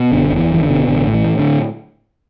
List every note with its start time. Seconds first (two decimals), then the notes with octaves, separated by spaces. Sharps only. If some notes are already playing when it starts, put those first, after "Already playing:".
Already playing: B2
0.12 F#1 D3
0.32 E2
0.38 E3
0.50 F#1 E3
0.63 D3
0.69 B2
0.88 A1 D3
1.07 A2
1.14 E3
1.26 A2
1.39 D3